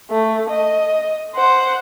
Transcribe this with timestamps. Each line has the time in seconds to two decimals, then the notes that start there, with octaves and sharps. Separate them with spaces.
0.10 A3
0.50 D#5
1.36 C5 F#5